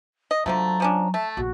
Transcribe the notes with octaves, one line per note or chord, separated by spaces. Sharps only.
D#5
D3 F3 F#3 A3 A#5
F3 C#4 D4
A3 A5
A#1 F#4